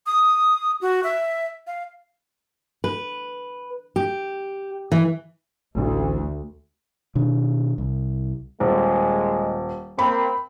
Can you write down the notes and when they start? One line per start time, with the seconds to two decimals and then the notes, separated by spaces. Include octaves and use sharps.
0.06 D#6
0.81 F#4
1.04 E5
1.67 F5
2.84 B4
3.96 G4
4.92 E3
5.76 A1 D2
7.15 B2 D#3 D4
7.78 C2
8.60 D#1 G#3
9.99 A#3 C4 B5